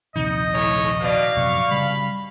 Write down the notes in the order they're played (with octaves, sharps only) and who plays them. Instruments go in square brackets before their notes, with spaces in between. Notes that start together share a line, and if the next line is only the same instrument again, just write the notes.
[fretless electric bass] A#1 D#2 C3 [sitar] D#4 [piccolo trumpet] D#5
[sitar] G#2 [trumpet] C#5
[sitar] B2 D5 [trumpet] F5
[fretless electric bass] A#1 F#2 C3 [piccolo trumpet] C#6
[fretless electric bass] C#3 G3 [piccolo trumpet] B5